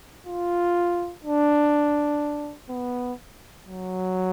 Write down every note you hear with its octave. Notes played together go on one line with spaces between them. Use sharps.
F4
D4
B3
F#3